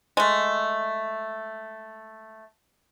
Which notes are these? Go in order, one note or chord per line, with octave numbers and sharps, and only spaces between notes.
G#3 A3